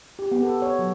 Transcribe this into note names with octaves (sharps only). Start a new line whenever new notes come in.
G4
B3
A4
C#5
F#3